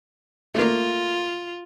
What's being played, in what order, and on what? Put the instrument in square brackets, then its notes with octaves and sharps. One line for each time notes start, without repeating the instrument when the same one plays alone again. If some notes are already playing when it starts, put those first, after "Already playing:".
[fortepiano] A3 A#3 [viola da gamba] F4